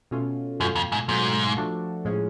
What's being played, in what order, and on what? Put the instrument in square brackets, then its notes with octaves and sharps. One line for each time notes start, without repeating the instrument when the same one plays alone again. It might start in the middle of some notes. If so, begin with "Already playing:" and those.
[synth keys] B2 A3 C#4 F4
[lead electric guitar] F#2 [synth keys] B2 A3 F4
[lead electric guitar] F2
G#2
[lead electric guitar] G#2 [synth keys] B2 F#3 A3 F4
[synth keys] F3 A3 D4 F#4 A4
A2 F3 G#3 C#4